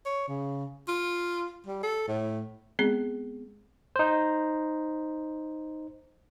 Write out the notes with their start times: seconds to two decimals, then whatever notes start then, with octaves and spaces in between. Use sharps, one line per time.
0.06 C#5
0.28 C#3
0.88 F4
1.66 G3
1.83 A4
2.08 A2
2.79 G#3 B3 C4 G#4
3.96 D#4 C5